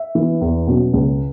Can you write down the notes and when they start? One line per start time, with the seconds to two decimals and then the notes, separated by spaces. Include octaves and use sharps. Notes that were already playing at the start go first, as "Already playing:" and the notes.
Already playing: E5
0.15 E3 B3
0.41 E2
0.67 B2 F#3 C#4
0.93 C#2